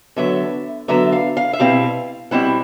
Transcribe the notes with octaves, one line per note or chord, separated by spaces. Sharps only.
D3 F#3 B3 E5
D3 F#3 B3 E5
F5
F5
E5
B2 G3 C4 E4 F5
B2 G3 C4 E4 F#5